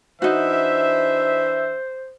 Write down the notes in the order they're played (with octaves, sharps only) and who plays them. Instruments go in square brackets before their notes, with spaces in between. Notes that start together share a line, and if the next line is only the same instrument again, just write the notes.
[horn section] E3 D4 E5 [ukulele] D#4 F#4 [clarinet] C5